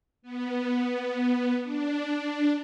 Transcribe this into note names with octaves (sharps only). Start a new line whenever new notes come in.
B3
D4